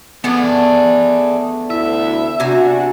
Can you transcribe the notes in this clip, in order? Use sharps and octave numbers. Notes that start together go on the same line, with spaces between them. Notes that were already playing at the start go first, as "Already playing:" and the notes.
E3 A3 B3 D4 G#4 D5
D2 E4 E5
C3 D4 F#4 G#5 A#5